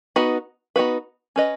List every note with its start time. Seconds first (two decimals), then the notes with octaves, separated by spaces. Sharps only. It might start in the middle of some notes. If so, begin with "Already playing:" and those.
0.16 B3 D#4 F#4 B4
0.76 B3 D#4 F#4 B4
1.36 C#4 B4 D#5